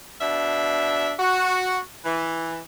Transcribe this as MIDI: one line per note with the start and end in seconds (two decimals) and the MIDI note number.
0.21 1.12 47
0.21 1.12 62
0.21 1.12 76
1.20 1.78 66
2.05 2.58 52